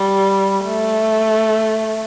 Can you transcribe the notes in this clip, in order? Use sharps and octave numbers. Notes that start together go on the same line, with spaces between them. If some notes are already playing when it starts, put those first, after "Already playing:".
Already playing: G3
A3